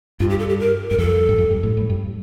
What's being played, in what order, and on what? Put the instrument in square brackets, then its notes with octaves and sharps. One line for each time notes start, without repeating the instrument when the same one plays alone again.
[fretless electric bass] G2 [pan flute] F4
[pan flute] G4
A4
G4
A#4
[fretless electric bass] G2 [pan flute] A#4
[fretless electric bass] F2 [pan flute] A4
[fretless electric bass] G2
F2
G2
A2
A2
G2